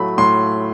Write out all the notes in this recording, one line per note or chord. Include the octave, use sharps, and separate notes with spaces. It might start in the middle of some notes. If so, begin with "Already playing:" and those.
Already playing: A2 F#3 A3 B5
A2 C6